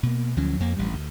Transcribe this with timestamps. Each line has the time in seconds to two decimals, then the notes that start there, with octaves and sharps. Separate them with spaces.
0.03 B2 A#3
0.37 D2 F3 F#3 C#4
0.60 F2 A#3
0.77 A1 G2 G3
0.94 D2